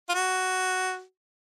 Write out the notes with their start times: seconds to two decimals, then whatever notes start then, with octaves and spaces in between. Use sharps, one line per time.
0.09 F4
0.14 F#4